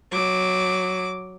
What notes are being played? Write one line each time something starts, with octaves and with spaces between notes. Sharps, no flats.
F#3 D6